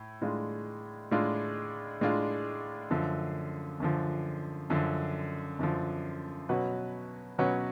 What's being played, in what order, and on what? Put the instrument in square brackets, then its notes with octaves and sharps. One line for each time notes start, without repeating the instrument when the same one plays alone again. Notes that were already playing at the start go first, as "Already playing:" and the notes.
Already playing: [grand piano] A2
A2 G#3 D4 F4
A2 G#3 D4 F4
A2 G#3 D4 F4
F#2 D3 F3
F#2 D3 F3
F#2 D3 F3
F#2 D3 F3
B2 F#3 C#4 F#4 B4
B2 F#3 C#4 F#4 B4